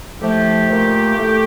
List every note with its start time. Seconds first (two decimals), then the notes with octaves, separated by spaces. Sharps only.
0.21 A2 F3 A3 G4
0.69 A#2 A3
1.15 A2 A3